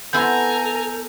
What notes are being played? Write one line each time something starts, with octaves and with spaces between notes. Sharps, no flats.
B3 E4 A4 C5 G#5 A#5 G6